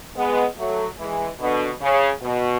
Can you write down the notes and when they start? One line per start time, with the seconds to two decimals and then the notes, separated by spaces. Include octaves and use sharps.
0.16 G#3 B3
0.57 F#3 A3
0.98 E3 G#3
1.40 B2 D3
1.81 C#3
2.22 B2